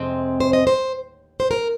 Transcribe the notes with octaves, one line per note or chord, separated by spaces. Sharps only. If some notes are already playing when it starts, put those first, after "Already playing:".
Already playing: F2 C3 G#3 C4
C5
D#5
C5
C5
A#4